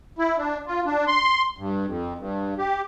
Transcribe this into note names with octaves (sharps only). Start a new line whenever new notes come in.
E4
D4
F4
D4
C6
G2
F2
G2
G4